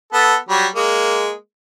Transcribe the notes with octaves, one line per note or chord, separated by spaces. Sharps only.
B3 A4
F#3 G3
G#3 A#3